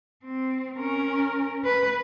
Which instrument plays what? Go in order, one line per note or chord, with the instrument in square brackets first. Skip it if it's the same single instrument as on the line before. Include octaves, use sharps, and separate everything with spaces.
[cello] C4
C#4 A#4
B4